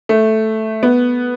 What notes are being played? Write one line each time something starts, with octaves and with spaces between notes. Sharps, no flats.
A3
B3